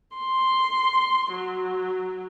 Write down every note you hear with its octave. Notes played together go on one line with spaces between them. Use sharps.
C6
F#3